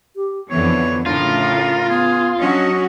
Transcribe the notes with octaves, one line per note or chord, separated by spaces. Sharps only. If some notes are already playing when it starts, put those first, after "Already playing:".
G4
F2 D3 E3 B3 C#5
A2 C#3 D4 F4 A#4
B3 G#4
F#3 C#4 D4 F#4 D#5